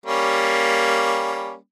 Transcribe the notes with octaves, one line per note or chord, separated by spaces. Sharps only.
G3 A#3 C#4